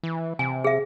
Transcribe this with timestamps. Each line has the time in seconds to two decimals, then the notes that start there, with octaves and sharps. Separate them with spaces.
0.03 E3
0.39 C3 G#5
0.64 G#4 E5